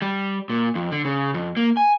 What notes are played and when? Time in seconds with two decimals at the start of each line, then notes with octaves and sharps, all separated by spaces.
0.02 G3
0.50 A#2
0.75 F2
0.92 D3
1.05 C#3
1.34 F2
1.57 A#3
1.77 G#5